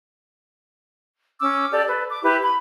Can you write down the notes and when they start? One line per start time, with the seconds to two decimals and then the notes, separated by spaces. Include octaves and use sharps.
1.40 C#4 D6 E6
1.73 G4 A4 D5
1.87 A4 B4
2.09 D6
2.22 E4 G4 B4
2.43 B5